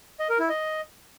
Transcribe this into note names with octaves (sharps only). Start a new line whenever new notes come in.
D#5
A#4
E4
D#5